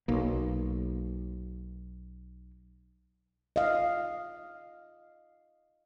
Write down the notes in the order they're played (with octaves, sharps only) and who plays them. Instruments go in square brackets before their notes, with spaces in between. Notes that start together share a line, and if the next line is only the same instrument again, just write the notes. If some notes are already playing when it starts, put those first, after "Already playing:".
[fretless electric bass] B1 A#3
[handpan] D#5 F5